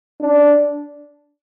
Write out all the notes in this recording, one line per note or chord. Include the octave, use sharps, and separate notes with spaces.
D4